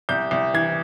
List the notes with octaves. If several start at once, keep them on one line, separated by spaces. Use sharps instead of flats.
C2 G6
C2
E3 G#6